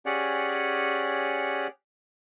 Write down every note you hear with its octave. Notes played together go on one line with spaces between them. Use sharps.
C#4 G4 G#4 C#5 D5 F#5